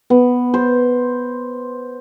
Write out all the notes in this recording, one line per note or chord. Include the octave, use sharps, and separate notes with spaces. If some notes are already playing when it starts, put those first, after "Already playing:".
B3
C5